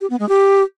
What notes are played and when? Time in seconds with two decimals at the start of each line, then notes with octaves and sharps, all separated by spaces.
0.01 G4
0.10 B3
0.19 G#3
0.29 G4